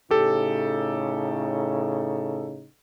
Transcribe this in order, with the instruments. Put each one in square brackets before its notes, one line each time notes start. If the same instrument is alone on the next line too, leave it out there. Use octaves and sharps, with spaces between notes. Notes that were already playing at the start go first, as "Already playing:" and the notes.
[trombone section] A2 C#3 D#4 [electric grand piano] G4 A4